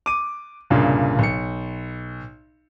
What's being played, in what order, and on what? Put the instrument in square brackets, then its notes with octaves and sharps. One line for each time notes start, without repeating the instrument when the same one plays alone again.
[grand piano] D6 D#7
C2 G2 A#2 C#3
B1 C#7